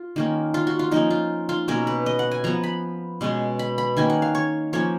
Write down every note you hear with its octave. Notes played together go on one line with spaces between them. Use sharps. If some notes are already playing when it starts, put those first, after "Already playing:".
Already playing: F4
D#3 A#3 C#4
F4
F#4
F4
F3 A#3 C#4 D#4
F4
F4
B2 F#3 A#3 C#4 A#4
B4
D#5
F#5
G#5
F3 B3 A#5
B5
B2 G#3 C#4
B5
B5
D#3 A#3 C#4 G#5
F#5
F5
C#5
F3 A#3 C#4 C#5